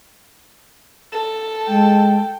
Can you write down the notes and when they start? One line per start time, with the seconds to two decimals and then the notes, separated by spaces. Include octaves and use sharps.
1.13 A4
1.68 G#3 G5